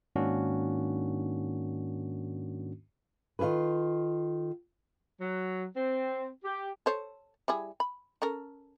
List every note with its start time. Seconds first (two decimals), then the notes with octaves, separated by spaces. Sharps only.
0.16 G#2 D#3 A#3 C#4 D4 F#4
3.39 D#3 F4 G#4 A4 B4
5.21 F#3
5.76 C4
6.45 G4
6.86 A4 C5 C#5
7.48 G3 E4 G#4
7.80 B5
8.22 C#4 A4 A#4